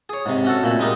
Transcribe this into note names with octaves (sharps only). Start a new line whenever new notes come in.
G#4 C#5
G#2 C3
C#4 F#4 A4
A#2 A3 B5
G#3 D#4 G4 A#4